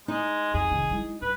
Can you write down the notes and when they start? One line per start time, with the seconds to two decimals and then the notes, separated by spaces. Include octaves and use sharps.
0.08 G#3 D#4
0.54 F2 G#4
0.71 F1 D#3
0.90 G#3 E4
1.22 G2 B4